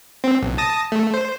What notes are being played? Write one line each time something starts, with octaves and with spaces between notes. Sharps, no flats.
C4
B1
A5 D#6 A#6
A3
C5